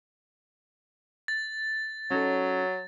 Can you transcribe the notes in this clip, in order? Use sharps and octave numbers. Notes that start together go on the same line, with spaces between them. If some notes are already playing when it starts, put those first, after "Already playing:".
A6
F#3 C#4 D#4 A4